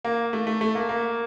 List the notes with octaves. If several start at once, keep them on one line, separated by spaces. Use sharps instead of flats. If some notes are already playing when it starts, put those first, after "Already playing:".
A#3
A3
A3
A3
A#3
A#3